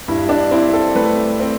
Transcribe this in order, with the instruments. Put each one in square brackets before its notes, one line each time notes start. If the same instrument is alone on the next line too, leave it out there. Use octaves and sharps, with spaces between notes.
[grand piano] G2 E4
D4
C4 E4
A4
A3 B4
C4